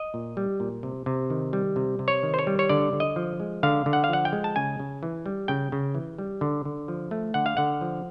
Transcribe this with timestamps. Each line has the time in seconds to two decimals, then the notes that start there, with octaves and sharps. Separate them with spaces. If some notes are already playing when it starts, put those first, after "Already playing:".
Already playing: D#5
0.14 A#2
0.37 G3
0.60 A#2
0.83 C3
1.06 C3
1.30 D#3
1.53 G3
1.76 C3
1.99 C3
2.08 C#5
2.23 D#3
2.34 C5
2.39 C#5
2.47 G3
2.59 C#5
2.69 D3 D5
2.93 D3
3.00 D#5
3.16 F3
3.40 G#3
3.63 D3 F5
3.86 D3
3.93 F#5
4.04 F5
4.09 F3 F#5
4.25 G5
4.33 G#3
4.44 A5
4.56 C#3 G#5
4.80 C#3
5.03 E3
5.26 G3
5.48 C#3 G5
5.72 C#3
5.95 E3
6.18 G3
6.41 D3
6.65 D3
6.88 F3
7.11 A3
7.34 D3 F#5
7.46 F5
7.57 D3 F#5
7.81 F3